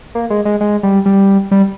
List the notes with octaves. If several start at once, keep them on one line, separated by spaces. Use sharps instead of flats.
A#3
G#3
G#3
G#3
G3
G3
G3